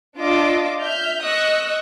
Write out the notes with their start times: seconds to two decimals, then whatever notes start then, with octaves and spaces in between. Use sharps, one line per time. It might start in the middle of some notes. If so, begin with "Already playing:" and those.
0.18 D4 F4 D#5 D6 E6
0.79 E5 F6 G6
1.23 D#5 C#6 D#6 E6 F#6